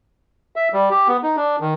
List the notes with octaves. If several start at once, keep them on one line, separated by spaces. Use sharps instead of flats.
E5
G3
G4
B3
D#4
D4
D#3